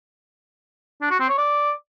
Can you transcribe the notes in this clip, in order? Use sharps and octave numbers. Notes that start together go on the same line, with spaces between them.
D4
F#4
C4
C#5
D5